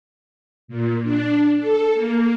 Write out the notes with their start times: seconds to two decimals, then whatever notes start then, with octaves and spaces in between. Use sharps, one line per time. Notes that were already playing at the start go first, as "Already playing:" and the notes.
0.68 A#2
1.03 D4
1.58 A4
1.94 A#3